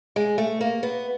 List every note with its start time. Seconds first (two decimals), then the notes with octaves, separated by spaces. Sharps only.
0.16 G#3
0.38 A3
0.61 A#3
0.83 B3